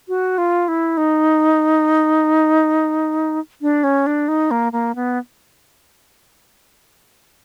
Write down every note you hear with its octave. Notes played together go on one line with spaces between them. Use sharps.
F#4
F4
E4
D#4
D4
C#4
D4
D#4
A#3
A#3
B3